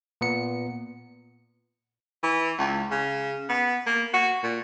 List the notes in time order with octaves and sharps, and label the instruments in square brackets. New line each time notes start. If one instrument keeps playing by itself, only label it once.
[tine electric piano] A#2 B3 C#7
[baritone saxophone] E3
C#2
C#3
B3
A#3
F#4
A#2